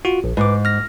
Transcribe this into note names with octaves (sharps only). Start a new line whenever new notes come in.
F4 F#4
A#1
G#2 B4 D6
F6 A#6